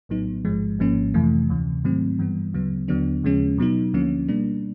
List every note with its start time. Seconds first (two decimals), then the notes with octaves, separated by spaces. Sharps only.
0.09 A#1 A2 F#3 B3 D#4
0.45 A1 G#2 F3 G#3
0.79 G#1 G#2 F3 A#3 C#4
1.14 F2 C3 E3 A3
1.49 D2 C3 E3
1.84 G#2 D#3 F#3 A3 C4
2.19 G2 E3 G3 B3
2.54 D2 C#3 F#3 B3
2.88 D#2 D3 F#3 B3 D4
3.24 D#2 C#3 F3 G#3 C#4
3.58 B2 F#3 B3 D#4
3.94 D2 D3 F3 A#3 C#4
4.28 B2 G3 A#3 D4